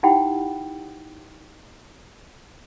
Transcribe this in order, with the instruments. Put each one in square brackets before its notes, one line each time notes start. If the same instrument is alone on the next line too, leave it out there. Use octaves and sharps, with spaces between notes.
[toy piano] D#4 E4 G4 F#5 G5 B5